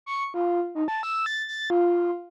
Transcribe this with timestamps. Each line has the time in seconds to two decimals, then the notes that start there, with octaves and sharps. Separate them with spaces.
0.06 C#6
0.34 F4
0.75 D#4
0.88 A5
1.03 E6
1.26 A6
1.48 A6
1.70 F4